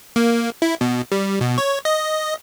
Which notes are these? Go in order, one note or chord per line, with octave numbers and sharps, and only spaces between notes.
A#3
E4
B2
G3
B2
C#5
D#5